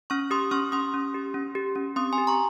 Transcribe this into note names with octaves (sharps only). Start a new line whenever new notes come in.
C#4 C#6 F6
G4 C6 D#6
C#4 C#6 F6
C#4 C6 D#6
C#4
G4
C#4
G4
C#4
C4 C6 D#6
G#5 C6
G4
A#5 C#6